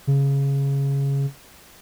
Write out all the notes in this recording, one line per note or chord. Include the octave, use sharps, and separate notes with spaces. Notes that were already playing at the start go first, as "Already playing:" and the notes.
C#3